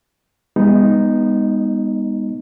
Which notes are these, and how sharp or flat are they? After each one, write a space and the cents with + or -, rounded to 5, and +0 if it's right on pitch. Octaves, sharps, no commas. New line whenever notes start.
G#3 -35 B3 +0 D#4 +0